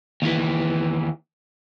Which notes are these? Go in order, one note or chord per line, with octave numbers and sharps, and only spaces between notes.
D#2 E3